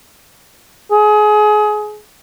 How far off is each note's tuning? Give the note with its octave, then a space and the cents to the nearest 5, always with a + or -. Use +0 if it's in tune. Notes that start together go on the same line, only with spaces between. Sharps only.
G#4 +25